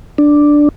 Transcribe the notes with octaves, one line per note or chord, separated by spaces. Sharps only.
D4